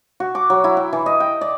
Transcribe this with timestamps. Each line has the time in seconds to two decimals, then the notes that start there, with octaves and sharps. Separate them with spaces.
0.20 F#4
0.35 D6
0.50 F#3
0.64 E4
0.77 G5
0.93 E3
1.06 D#5
1.20 G5
1.41 D5